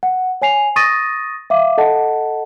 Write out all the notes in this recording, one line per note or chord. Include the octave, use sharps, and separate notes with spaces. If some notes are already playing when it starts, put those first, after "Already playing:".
F#5
C#5 G#5 C7 F7
C#6 D#6 A6 A#6 D#7
E5 F5 D6
A4 D#5 F#5 A5